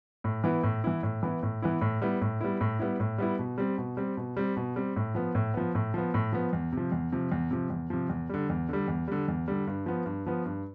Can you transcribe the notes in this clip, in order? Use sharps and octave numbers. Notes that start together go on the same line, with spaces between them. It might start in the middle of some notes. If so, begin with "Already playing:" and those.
A2
E3 B3 E4
A2
E3 B3 E4
A2
E3 B3 E4
A2
E3 B3 E4
A2
G3 B3 E4
A2
G3 B3 E4
A2
G3 B3 E4
A2
G3 B3 E4
B2
G3 C4
B2
G3 C4
B2
G3 C4
B2
G3 C4
A2
F3 B3
A2
F3 B3
A2
F3 B3
A2
F3 B3
E2
C3 F3
E2
C3 F3
E2
C3 F3
E2
C3 F3
E2
D3 G3
E2
D3 G3
E2
D3 G3
E2
D3 G3
G2
F3 B3
G2
F3 B3
G2